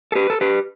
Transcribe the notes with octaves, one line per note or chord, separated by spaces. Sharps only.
A4
G4 B4
A4
G4 B4